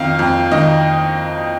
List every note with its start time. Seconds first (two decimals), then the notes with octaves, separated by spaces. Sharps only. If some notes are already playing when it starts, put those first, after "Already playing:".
Already playing: F2 D#3 F5
0.19 F2
0.51 D#3 D#5